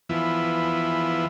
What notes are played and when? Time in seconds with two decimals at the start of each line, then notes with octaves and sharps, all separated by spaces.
0.09 E3 F3 B3 E4